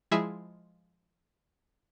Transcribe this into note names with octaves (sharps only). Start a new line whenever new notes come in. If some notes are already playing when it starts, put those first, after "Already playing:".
F3 G#3 E4 G#4 E5